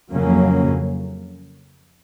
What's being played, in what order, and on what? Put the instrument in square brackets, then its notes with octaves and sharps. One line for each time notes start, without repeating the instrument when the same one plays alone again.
[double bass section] F2 C#3 F#3 A#3 C#4